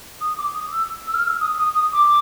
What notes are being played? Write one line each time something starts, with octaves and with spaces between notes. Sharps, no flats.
D#6
D6
D#6
E6
E6
F6
E6
D#6
D#6
D#6
D6